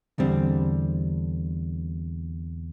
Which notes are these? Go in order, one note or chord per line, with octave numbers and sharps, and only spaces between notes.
E2 D3 G3 C4